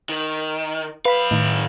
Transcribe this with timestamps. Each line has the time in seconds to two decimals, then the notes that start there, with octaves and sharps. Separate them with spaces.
0.10 D#3
1.05 F#2 B4 F5 B5
1.31 A2 D#3